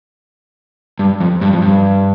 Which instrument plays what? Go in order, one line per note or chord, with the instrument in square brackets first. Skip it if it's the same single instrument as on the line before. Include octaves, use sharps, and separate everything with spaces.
[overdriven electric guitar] G2
F2
G2
F2
G2